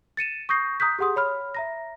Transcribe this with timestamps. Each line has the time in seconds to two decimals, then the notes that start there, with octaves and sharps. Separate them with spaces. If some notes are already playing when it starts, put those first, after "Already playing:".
0.17 A6 C#7 D#7 E7
0.49 C#6 D#6 G6 A#6 C7
0.80 A#5 D#6 F#6 G6 B6
0.99 G4 G#4 F#5 C6 D#6
1.16 C#5 B5 F6
1.55 E5 A#5 A#6